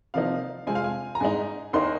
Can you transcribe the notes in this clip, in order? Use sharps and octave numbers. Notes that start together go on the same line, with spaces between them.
C3 F3 A#3 D#4 F5
C3 G#3 C4 F4 G#5
F5
G#5
A#5
G#2 G#3 D#4 G#5
D#2 D#3 A#3 D#4 C6